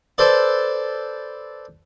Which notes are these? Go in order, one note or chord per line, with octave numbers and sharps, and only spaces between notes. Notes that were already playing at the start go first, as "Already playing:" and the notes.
A4 B4 C5 D5